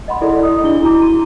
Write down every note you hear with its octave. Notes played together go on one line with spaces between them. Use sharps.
D#5 F#5 B5 C6
E4 G#4 A4 D5
D#5 D#6
D4 E4 G#4 G7
E4 F#4 A#5 D6
C6 D#7